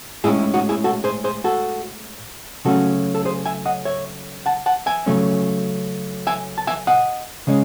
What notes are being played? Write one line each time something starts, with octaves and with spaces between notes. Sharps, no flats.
A2 G#3 C#4 E4 G#4
E4
D#4 F#4
E4 G#4
F#4 A4
G#4 C5
G#4 C5
F#4 A4
C#3 F#3 A3 C#4 F#4 A4
A4
G#4 C5
E5 G#5
D#5 F#5
C#5 E5
F#5 A5
F#5 A5
E5 G#5
C#3 F#3 A3 C#4
E5 G#5
A5
E5 G#5
D#5 F#5
C#3 G#3 C#4